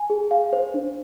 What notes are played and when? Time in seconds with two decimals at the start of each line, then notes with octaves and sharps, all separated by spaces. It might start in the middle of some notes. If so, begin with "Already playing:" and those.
Already playing: G#5
0.10 G#4
0.31 F5
0.53 C5
0.74 D4